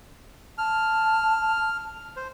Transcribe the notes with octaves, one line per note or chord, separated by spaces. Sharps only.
A5 F6
C5